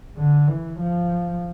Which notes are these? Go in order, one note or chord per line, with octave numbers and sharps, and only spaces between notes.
D3
E3
F3